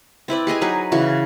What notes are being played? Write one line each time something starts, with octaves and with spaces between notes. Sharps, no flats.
C4 E4 B4 D5
G4 G#4 D#5 G#5
F#3 D#4 G#4 B4
C#3 E3 F#4